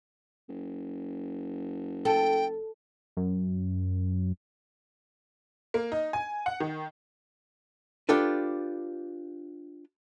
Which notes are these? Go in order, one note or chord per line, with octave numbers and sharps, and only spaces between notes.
F#1
A4 G5
F#2
A#3
D#4
G#5
F#5
D#3
D4 F4 G4 A4 B4